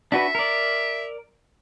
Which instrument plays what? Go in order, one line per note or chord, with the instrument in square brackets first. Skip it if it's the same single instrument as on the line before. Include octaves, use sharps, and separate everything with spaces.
[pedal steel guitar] D4 F#4 B4 [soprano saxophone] E5
[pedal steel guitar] A#4 D5